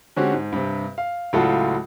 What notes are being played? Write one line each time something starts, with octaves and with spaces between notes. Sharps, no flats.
D3 G#3 C4 C#4 F#4 G4
G#2
G2 C3
F5
C#2 A2 F#3 F4 A4 F#5